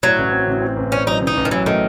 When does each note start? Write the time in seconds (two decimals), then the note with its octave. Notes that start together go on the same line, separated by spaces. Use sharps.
0.03 A2 F#3
0.18 A1
0.32 C4
0.47 A1
0.62 C4
0.77 A1
0.92 C4 C#4
1.06 F#3 D#4
1.22 A1
1.27 D#4
1.37 A1
1.45 D#3
1.51 E3 F#3
1.66 D#3 A3